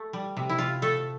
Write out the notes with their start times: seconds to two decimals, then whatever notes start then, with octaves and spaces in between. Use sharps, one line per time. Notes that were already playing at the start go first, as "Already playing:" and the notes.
Already playing: A3
0.13 G3
0.37 C3
0.49 E4
0.58 C3 F4
0.82 A3 A4